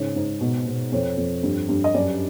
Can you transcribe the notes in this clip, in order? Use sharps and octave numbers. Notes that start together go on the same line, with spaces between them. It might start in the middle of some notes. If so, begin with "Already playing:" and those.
Already playing: G#2 C#3 C#5
G#2
B2
B2
F2 C#5
F2
G2
G2
D#5
F#2 D5